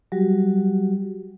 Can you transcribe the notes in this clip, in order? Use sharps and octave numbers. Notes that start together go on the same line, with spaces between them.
F#3 G3 F#4 G4